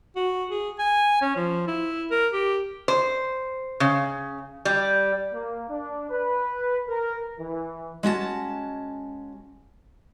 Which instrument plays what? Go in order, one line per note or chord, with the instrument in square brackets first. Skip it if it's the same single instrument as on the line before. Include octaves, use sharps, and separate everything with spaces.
[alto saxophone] F#4
G#4
G#5
C#4
F3
E4
A#4
G4
[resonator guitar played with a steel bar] C5
C#3
G3
[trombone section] A#3
D4
B4
A#4
E3
[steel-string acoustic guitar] G#3 C#4 F#4 A5